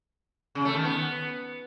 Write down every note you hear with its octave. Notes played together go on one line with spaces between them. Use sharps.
C#3
A3
D#3
B3